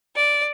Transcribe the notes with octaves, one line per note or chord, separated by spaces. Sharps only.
D5